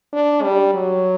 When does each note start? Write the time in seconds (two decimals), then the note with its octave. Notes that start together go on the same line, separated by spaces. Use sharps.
0.13 D4
0.43 G3
0.74 F#3